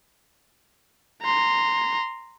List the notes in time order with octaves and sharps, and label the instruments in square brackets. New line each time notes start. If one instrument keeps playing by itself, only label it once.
[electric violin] A#5 C6